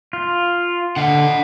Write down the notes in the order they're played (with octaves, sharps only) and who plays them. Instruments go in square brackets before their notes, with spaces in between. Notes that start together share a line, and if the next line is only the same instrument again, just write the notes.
[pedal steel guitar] F4
[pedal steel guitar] D3 [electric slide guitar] D#5 F#5